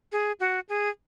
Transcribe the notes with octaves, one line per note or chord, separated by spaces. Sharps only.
G#4
F#4
G#4